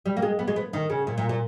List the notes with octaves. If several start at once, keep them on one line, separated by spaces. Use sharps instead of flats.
G3
A#3
G#3
B3
G#3
B3
D#3
C#3
A#2
A#2
A#2